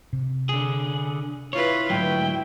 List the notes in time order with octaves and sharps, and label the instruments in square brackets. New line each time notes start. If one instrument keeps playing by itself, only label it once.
[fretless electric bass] C3
[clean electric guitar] D3 G#4
[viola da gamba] E4 F4 B4 [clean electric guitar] C#5
[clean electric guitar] D2 G#2 F#3 [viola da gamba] E4 [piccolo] G5